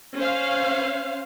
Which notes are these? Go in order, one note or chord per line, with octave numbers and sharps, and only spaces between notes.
C#4 C5 F5